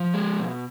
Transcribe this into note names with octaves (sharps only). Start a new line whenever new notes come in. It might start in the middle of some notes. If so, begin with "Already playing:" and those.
Already playing: F3
G#3
B2